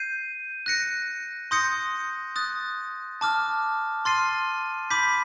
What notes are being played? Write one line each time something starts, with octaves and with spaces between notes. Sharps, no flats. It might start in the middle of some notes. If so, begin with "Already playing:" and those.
Already playing: G6 C7 D#7
F#6 A#6 C#7
C6 D#6 G6 A#6 C#7
D#6 F#6 A6
A5 D6 F6
C6 F6 A6 C7 D#7
B5 D6 G6 B6